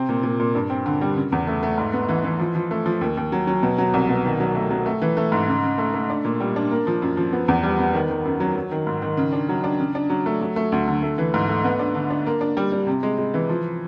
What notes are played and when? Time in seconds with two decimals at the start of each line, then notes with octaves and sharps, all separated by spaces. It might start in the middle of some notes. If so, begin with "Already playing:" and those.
Already playing: C3 C4
0.09 A#2
0.23 A#2
0.40 A#2
0.55 G2
0.70 C4
0.86 D3
1.01 G3
1.16 C#3
1.32 E2
1.47 A3
1.63 A3
1.78 G#2
1.93 B3
2.09 E3
2.24 E3
2.39 F3
2.55 F3
2.71 A3
2.86 F3
3.01 D#2
3.17 D#2
3.32 F#3
3.47 F#3
3.63 B2
3.78 F#3
3.94 C2
4.09 B2
4.25 D#3
4.40 F#3
4.55 A3
4.71 F#3
4.86 A3
5.02 E3
5.17 A3
5.32 G#2
5.48 C#3
5.63 C#3
5.78 A3
5.94 A3
6.10 D4
6.25 A#2
6.40 G3
6.56 D4
6.71 A#3
6.87 F3
7.02 F#2
7.17 F3
7.32 B3
7.48 E2
7.63 G3
7.79 B3
7.94 D#3
8.10 D#3
8.25 F#2
8.40 F#3
8.56 F#3
8.71 D#3
8.87 G#2
9.02 D#3
9.17 C#3
9.33 D4
9.49 F#3
9.64 D4
9.80 C#3
9.95 D4
10.10 F#3
10.26 A3
10.41 F#3
10.56 A3
10.72 D2
10.88 D3
11.02 A3
11.18 E3
11.34 G#2
11.49 A3
11.64 B3
11.79 D4
11.95 D3
12.10 D4
12.26 A#3
12.41 D4
12.57 G3
12.72 G3
12.87 C3
13.03 G#3
13.18 G#3
13.34 E3
13.49 F3